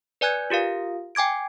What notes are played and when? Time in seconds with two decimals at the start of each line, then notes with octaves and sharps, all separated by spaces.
0.21 B4 D5 G#5 F#6 G#6
0.50 F4 G4 A#4 F5
1.15 G5 G#5 D6 G#6 D7